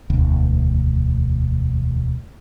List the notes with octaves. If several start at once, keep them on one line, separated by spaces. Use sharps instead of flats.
E1 D2